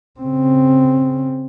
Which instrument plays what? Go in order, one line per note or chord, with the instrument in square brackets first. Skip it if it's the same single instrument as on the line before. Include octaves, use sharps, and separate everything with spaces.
[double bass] C#3 C4